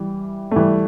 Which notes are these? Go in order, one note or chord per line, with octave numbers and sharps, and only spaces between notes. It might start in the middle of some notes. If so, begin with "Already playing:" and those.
Already playing: E3 G3
A3
E3 G3